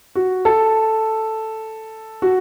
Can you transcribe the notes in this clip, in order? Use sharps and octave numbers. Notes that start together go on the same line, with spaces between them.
F#4
A4
F#4